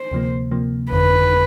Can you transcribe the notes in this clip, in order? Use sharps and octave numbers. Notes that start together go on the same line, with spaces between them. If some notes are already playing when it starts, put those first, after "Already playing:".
Already playing: C5
D2 C3 F3 A#3
D2 C3 F3 A#3
G1 F2 D3 B4